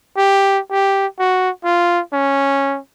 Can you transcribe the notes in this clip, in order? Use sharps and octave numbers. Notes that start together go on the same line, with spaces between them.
G4
G4
F#4
F4
C#4